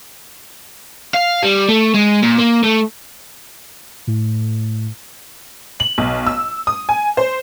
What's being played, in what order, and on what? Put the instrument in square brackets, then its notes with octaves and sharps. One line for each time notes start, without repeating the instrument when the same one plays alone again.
[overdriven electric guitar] F5
G3
A3
G#3
A#2
A#3
A3
[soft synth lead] A2
[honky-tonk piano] F#7
B1
E6
D#6
G#5
C5